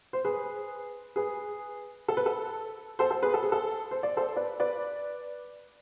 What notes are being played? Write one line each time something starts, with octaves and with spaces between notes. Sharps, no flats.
C5
G#4 B4
G#4 B4
A4
B4
A4
A4 C5
A4 C5
G#4 B4
A4
G#4
A4
C5
D5
A4 C5
B4 D5
B4 D5